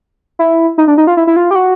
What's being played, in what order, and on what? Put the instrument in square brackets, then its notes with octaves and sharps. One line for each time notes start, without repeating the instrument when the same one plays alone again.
[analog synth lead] E4
D#4
D4
D#4
F4
E4
E4
F4
G4
F#4